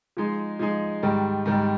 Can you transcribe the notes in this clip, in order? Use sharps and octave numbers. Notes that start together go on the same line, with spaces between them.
F3 G#3 D#4 G#4
F3 G#3 D#4 G#4
G#2 D#3 G3
G#2 D#3 G3